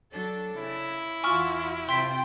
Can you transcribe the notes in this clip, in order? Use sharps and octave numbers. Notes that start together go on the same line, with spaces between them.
F#3 D4 A4
C#3 E4
E2 F4 F#4 G#5 C#6 F6
C3 F4 C5 G5 C6 B6